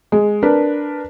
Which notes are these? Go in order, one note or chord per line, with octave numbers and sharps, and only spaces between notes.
G#3
D4 A#4 B4